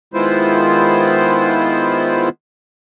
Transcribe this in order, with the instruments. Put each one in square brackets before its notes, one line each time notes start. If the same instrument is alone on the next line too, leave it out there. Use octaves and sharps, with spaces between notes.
[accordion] D#3 G#3 B3 E4 F4 C5